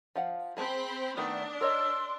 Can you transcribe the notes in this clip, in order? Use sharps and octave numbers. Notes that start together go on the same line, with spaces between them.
F3 F5 F#5
C4 G#4 A5 B5
D#3 A3 B3 D4 D#6
A#4 C#5 D#5 C6 E6